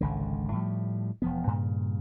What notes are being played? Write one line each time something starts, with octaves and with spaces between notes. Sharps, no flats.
G#1 C#2 D3
A2 F3 G3
E1 F3 B3
G2 A#2 C#3